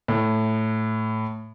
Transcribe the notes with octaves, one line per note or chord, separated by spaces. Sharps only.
A2